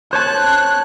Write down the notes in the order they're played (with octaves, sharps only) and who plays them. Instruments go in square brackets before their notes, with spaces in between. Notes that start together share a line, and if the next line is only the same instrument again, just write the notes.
[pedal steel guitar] C5 C#5 A5 [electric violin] F#6